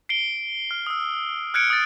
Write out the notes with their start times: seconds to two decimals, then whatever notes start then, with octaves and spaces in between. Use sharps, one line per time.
0.09 C7 D7 G7
0.71 F6
0.87 D#6 E6
1.54 F6 F#6 G#6 C#7 D7
1.70 D#6 A6